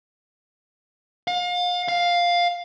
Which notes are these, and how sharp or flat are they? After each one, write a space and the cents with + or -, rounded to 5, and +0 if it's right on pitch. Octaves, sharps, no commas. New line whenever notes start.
F5 +35
F5 +5